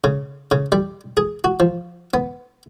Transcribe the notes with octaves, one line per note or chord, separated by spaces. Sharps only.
C#3
C#3
G3
G#4
F#4
F3
B3